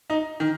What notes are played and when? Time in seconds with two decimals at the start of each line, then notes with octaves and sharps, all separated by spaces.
0.10 D#4
0.40 D#3